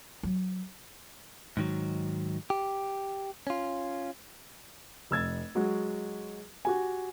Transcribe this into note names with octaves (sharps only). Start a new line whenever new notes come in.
F#3
G#2 D#3 F#3
G4
C#4 F4
F1 E6 G#6 A6
F#3 G#3 F#4
F#4 G4 G#5